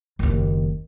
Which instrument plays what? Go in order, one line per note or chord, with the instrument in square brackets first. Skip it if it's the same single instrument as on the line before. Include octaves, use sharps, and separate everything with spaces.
[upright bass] F#1 D#2